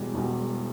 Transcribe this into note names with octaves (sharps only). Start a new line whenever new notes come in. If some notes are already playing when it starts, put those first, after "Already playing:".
Already playing: E1 E2 B2 G3
E1 E2 B2 G3